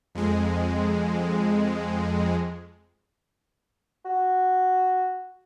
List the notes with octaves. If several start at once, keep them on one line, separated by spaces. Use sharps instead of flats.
F2 G#3
F#4